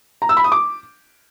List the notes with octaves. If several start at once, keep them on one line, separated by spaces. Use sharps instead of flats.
A#5
E6
B5
D#6
D6